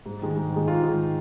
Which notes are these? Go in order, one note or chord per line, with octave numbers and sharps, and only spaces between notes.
G#2
D#3 G#3
G#2
D#3 G#3
G#2 F4
D#3 G#3